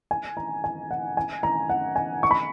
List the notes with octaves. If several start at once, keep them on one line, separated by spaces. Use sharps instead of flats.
G#5
A#5
G#5
F#5
G#5
A#5
F#5
G#5
C#6
B5